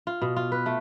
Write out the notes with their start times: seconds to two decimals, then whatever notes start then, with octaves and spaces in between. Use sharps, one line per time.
0.07 F4
0.22 B2
0.36 F4
0.52 B4
0.66 A3